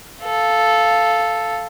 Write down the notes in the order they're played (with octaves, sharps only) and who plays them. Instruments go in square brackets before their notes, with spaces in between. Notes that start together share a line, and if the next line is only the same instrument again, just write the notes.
[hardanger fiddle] A4 F5